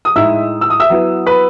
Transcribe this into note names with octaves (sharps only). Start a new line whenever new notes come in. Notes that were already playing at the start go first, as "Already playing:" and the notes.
D#6
A2 G#3 D#4 E5 E6
E6
D#6
E5 E6
F#3 B3 E4
B4 B5